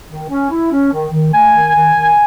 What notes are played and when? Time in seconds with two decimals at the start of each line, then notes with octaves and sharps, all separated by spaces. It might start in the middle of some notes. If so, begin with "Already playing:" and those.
0.09 D#3
0.29 C#4
0.50 E4
0.71 C#4
0.92 D#3
1.12 D#3
1.33 A3 G#5
1.53 D#3
1.74 D#3
1.95 D#3